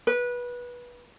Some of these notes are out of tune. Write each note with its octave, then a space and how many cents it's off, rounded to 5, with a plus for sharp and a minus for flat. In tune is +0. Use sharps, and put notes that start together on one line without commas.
B4 -20